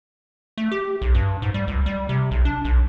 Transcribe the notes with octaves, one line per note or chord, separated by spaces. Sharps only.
A3
G4
B1
G2
G#2
G3
C#2
G3
C3
B1
D4
B1